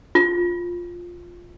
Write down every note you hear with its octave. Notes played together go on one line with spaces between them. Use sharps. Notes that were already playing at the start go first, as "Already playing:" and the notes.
F4